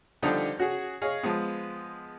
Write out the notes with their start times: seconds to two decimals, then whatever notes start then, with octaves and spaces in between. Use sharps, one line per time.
0.22 D3 F3 G3 D4 D#4 G4
0.57 C#4 F#4 G#4
1.02 G#4 C#5 D#5 F5
1.23 F3 G#3 B3